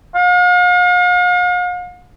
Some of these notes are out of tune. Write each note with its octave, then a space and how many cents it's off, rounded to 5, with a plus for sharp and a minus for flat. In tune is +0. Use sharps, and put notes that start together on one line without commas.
F5 +45